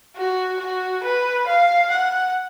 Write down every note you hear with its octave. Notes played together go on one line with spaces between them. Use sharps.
F#4
F#4
B4
F5
F#5